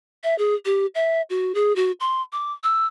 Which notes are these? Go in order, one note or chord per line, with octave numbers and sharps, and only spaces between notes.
E5
G#4
G4
E5
F#4
G#4
F#4
C6
D6
E6